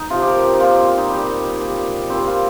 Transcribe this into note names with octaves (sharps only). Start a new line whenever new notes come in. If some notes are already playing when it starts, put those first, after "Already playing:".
Already playing: D#4
C3 F3 F4
G4
A#4
G4
D#4
A#2 F3 F4
C4
F4
D#4
A#2 G3
A#2 G3
A#2 G3 C4
F4